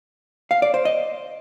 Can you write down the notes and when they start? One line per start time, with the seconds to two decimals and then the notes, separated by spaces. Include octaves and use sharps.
0.51 F5
0.62 D5
0.74 C5
0.85 D#5